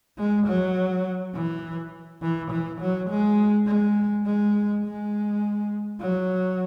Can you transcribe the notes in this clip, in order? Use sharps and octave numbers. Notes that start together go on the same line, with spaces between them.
G#3
F#3
E3
E3
E3
F#3
G#3
G#3
G#3
G#3
F#3